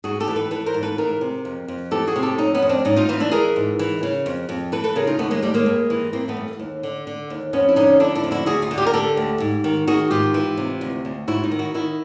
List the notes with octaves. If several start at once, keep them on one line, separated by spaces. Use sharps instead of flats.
G#2 F#4 G#4
G4 A4
E3
A4 B4
E3 A4 B4
A#4 C5
G#2
A4 B4
E3 G#4 A#4
C3
F2
F2
E3 G4 A4
F#4 G#4
C3
G4 A4
F2 C#4 D#4
B3 C#4
F2
C4 D4
G#2 C#4 D#4
D#4 F4
E3 D#4 F4
D4 E4
E3 G#4 A#4
G#2
E3
C#3
F2
F2
E3 A4 B4
A4 B4
C#3 G#4 A#4
D#4 F4
D#2 A3 B3
G#3 A#3
D#2 G3 A3
G#3 A#3
G2
E3
E3 A#3 C4
A3 B3
G2
D#2
D3
D3
D#2
F2 B3 C#4
E4
D3 C#4 D#4
D3 D4 E4
D4 E4
F2
E4 F#4
D2 F#4 G#4
D#4 F4
D3
F4 G4
A#4
D3 G4 A4
D2
G#2
D#3
D#3 F#4 G#4
G#2 F4 G4
E3
C3
D2
D2
G#2 E4 F#4
D#4 F4
D#3
E4 F#4
D#3 E4 F#4